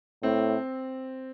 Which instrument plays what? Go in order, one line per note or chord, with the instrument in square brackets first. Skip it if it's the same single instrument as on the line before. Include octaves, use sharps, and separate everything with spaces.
[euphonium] A2 [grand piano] C4